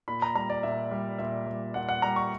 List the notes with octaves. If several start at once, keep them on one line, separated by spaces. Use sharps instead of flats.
A#2 B5
A#5
G3 A#5
D5
A#2 E5
G3
A#2 E5
G3
A#2 F#5
F#5
G3 A#5
C#6